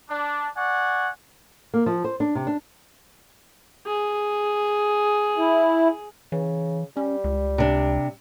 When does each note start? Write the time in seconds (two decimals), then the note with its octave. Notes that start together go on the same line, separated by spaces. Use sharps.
0.10 D4
0.57 D5 F#5 G#5 C#6
1.74 A#3
1.86 F3
2.04 C5
2.20 D4
2.35 C3
2.47 D4
3.86 G#4
5.38 E4
6.32 C#3 E3
6.97 G3 C#4
7.24 C#2
7.58 C3 D4